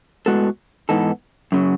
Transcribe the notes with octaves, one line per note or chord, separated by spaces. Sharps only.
A2 G#3 B3 F#4 A4
G#2 E3 B3 D#4 A4
F#2 C#3 F#3